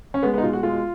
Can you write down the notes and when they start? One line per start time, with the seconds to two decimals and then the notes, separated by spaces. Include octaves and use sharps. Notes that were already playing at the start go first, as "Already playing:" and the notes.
0.14 C#4
0.23 G#3 B3
0.34 B3
0.38 D#4
0.42 B2 F4
0.53 F#4
0.63 G#3 F4